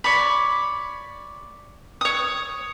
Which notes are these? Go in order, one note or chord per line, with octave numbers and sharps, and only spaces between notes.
C#5 D5 B5
C#5 D#6